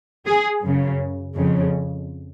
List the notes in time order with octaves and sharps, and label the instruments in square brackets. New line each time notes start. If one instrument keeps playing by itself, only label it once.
[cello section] G#4
F#2 C#3
F2 C#3